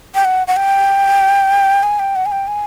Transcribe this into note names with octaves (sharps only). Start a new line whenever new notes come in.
G5
F#5
F#5
G5
G#5
G5
F#5
G#5
G5
G#5